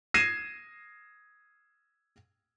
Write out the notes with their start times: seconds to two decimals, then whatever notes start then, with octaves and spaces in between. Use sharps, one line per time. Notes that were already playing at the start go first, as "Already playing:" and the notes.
0.14 G#6 A#6 C7 D#7 E7